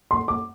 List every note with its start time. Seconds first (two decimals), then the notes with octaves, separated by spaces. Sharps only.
0.11 C6
0.28 D6